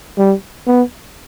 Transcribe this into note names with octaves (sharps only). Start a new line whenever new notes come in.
G3
B3